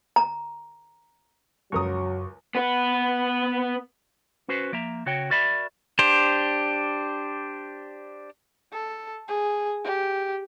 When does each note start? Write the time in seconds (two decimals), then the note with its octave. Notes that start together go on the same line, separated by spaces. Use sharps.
0.16 A#5
1.72 C#2 F#2 F#3 A#4 C#6 D#6
2.55 B3 B4
4.49 C#4 F#4 B4 C5
4.72 F3 A#3 E5 A#5
5.06 C#3 F#4 C#5 G5
5.30 F#4 A#4 D5 E5 B5
5.99 D4 G4 C5
8.72 A4
9.28 G#4
9.84 G4